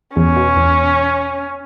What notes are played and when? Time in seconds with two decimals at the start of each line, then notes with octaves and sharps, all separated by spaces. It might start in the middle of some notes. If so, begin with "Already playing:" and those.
0.16 E2 C#4
0.36 B2
0.56 E2